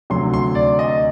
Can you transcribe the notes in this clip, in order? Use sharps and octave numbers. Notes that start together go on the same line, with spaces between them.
D2 C3 F#3 C6
C6
D5
D#5